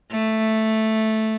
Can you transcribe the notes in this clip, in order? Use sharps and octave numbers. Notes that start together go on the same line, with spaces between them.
A3